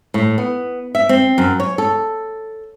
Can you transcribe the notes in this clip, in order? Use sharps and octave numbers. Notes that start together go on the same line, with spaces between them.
A2
B3
E5
C4
F#2
C#5
A4